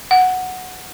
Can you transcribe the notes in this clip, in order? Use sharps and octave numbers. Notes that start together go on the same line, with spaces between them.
F#5